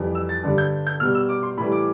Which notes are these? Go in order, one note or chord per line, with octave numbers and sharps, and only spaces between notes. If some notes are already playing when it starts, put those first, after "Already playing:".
Already playing: F2 E3 G3
E6
A6
G2 D3 G3
G6
G6
B2 G3 F6
E6
D6
C6
A2 E3 G3 B5
D6